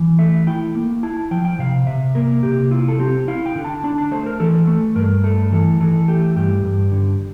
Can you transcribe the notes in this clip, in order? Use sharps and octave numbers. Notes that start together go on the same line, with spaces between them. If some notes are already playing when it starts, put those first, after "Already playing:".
Already playing: E3
A3 E5
E4 G5
A#3
E4 A5
A5
F3 G5
G5
C3 F5
C3 E5
A#3 A#4
C3 G4
E4 F4
A4
C4 G4
E4 F5
G5
D3
A5
D4 A5
A5
A3 C5
A#4
E3 A4
A3
G2 A#4
A3 A4
E3 A4
E3 A4
A3 G4
G2 G4
G2
D3